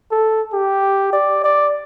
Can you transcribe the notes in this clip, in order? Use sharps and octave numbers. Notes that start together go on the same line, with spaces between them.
A4
G4
D5
D5